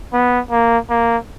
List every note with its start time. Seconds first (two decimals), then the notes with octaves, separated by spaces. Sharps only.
0.13 B3
0.51 A#3
0.90 A#3